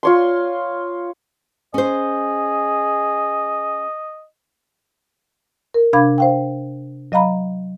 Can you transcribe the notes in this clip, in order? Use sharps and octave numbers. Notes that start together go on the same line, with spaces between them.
F4 C#5 C6
C#4 G#4 C5 D#5
A#4
C3 D4 F5 B5 D6 G#6
C5 F5 G5
F#3 D#5 F5 A#5 B5